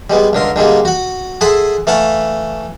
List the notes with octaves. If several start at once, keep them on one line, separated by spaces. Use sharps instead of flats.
G3 G#3 B3
C#2 D3 A#4 C6
D3 G3 G#3 A#3
F#4 F#5
G#4 A4 E5 F#5 C6 D#6
E3 A3 F5 F#5 A5 C#6